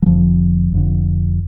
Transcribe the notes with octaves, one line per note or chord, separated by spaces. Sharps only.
F#3
F1 F2 D3 F3
F1 F2 D3